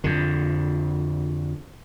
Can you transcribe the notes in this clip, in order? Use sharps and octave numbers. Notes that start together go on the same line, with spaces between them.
F2 D3